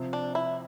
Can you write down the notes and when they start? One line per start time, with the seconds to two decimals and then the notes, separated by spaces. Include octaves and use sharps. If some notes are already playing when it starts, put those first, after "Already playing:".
Already playing: C3 F3 C4
0.13 D4
0.35 E4